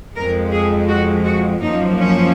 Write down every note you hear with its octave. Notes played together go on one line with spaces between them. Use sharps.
F2 F3 G#3 A#4
G#4
F#4
F#4
F#2 F3 A#3 D#4
C#4